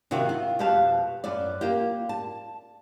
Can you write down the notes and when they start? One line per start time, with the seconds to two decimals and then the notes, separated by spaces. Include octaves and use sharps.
0.11 C3 D#3 F4 F#4
0.29 F4
0.59 F2 B2 G4 F5 A5
1.24 F#2 B3 D5
1.61 A#3 F4 G4
2.09 A5